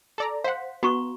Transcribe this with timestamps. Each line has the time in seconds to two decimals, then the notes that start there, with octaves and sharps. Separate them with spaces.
0.18 A4 D5 A#5
0.44 C5 F5 F#5
0.83 B3 F#4 A#5 C#6